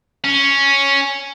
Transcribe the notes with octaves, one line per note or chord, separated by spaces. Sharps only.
C#4